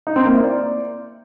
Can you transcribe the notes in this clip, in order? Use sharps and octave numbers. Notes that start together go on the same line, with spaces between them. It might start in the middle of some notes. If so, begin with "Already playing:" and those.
D#4
C4
A#3
E4
D5